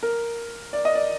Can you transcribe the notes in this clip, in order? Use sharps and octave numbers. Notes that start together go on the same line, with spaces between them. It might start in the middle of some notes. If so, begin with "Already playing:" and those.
A#4
D5
D#5
D5